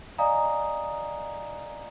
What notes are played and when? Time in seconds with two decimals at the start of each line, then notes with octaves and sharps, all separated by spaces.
0.18 D5 D#5 F5 G#5 A#5 D#6